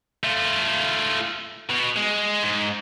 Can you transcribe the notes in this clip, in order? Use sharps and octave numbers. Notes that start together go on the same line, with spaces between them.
A3 F4
B2
G#3
G#2